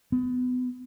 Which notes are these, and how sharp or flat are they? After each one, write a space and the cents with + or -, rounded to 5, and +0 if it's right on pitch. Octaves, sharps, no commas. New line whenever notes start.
B3 +25